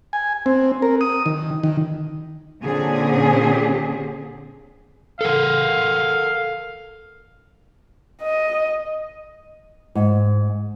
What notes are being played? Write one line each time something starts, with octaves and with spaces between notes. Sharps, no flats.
G#5
C4
A#4
D#6
D#3
D#3
A#2 D3 C4 C#4 G#4
A4 A#4 F5 F#5
D#5
G#2